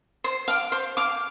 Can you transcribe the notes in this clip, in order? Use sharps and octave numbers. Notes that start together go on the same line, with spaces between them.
C5
F5 D6
C5
F5 D6